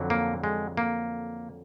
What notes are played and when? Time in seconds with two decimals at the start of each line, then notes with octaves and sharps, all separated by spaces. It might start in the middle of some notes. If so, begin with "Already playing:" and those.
Already playing: F2 D3 F#3
0.10 A#3
0.44 G#3
0.77 A#3